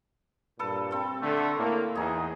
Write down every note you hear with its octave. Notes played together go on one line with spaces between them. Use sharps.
G2 A#2 A4 B4
C4 A4
D3 A3
A2 A#3
E2 D#4 G#4